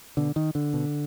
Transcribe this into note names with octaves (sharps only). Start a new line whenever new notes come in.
B2 D3
D#3
D3
B2